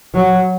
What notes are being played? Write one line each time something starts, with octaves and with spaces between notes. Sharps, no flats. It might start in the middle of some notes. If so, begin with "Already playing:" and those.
F#3